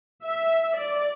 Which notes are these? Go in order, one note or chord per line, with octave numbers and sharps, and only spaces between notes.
E5
D5